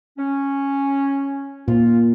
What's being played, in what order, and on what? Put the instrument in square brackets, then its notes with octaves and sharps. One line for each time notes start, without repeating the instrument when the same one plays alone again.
[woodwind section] C#4
[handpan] A#2 [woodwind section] F4